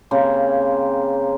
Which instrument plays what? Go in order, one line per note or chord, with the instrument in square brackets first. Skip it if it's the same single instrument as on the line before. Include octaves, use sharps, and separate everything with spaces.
[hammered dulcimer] C#3 A#3 C4 G4